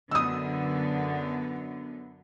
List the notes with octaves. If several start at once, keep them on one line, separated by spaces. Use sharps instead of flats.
F#2 D3 B3 D#6 E6